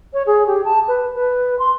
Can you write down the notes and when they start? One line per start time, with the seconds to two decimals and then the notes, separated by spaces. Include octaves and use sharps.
0.13 C#5
0.27 G#4
0.47 G4
0.65 A5
0.88 B4
1.15 B4
1.59 C6